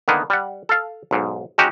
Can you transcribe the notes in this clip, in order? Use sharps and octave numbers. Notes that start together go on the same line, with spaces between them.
D3 D#3 A#3 B3
G3 F#5
A4 F5
B1 G#2
G#3 C#4 D#4 F#4 G4